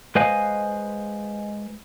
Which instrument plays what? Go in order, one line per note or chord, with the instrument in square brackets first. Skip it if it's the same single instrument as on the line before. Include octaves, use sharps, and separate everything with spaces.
[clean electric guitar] G#3 B4 C5 D#5 F5 G#5